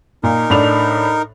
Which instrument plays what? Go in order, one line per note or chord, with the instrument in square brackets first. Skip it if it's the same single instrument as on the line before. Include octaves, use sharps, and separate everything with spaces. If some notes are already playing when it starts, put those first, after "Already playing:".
[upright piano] A#2 [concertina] D#4 A#4
[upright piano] A2 D4 F7